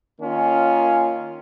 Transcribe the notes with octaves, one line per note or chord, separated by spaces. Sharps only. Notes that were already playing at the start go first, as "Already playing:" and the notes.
D#3 A#3 C#4 F4